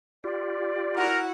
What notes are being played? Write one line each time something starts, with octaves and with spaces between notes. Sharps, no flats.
F4 G4 D5
E4 F#4 A#4 F#5